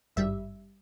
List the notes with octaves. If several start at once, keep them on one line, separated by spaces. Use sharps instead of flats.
G#1 G2 G3 E5